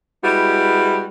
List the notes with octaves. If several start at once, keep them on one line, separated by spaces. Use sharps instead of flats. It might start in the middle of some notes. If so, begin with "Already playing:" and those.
G3 G#3 B3 E4 F#4